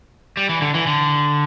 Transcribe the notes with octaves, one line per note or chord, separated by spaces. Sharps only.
G3
E3
D3
E3
D3